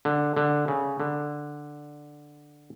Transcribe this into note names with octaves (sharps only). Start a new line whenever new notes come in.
D3
D3
C#3
D3